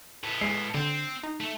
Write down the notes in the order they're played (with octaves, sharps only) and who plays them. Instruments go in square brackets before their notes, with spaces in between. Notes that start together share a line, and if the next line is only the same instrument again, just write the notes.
[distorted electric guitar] A2 B3
[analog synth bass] G#3 [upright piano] C7
[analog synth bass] D3 [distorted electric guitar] C4
[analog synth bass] D#4
[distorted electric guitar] A3